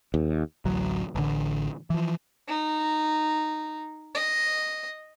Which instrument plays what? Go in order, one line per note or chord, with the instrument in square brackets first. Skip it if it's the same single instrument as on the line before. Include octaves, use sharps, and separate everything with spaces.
[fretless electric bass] D#2
[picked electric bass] A1 D2 F#3
A1 D3
E3 F3
[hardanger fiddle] D#4
D#5